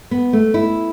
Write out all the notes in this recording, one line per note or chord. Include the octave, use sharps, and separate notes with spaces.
B3
A3
E4